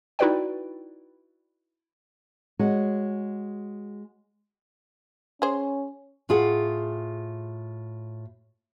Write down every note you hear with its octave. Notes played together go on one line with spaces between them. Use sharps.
D#4 E4 F#4 B4 D5 G5
G#3 F#4 C#5
C#4 G#4 C5
A2 F4 G#4 F#5